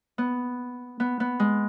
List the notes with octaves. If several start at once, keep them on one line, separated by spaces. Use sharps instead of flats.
B3
B3
B3
G#3